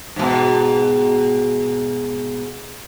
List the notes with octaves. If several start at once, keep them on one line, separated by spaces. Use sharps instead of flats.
G#2 B2